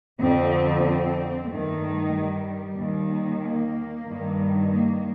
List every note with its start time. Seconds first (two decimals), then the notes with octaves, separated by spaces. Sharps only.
0.19 F2 D3 C4
0.84 C4
1.49 G2 D#3 A3
2.14 G3
2.78 D#2 D#3
3.43 A#3
4.07 G2 D#3
4.72 A#3